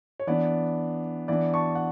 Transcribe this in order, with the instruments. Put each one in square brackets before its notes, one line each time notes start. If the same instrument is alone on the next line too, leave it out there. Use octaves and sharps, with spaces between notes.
[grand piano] C#5
E3 B3 D4 D5
E3 B3 D4 D5
A5 C#6
F#5